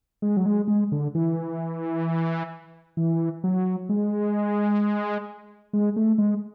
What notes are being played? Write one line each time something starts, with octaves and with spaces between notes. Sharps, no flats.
G#3
F#3
G#3
G#3
D3
E3
E3
F#3
G#3
G#3
A3
G#3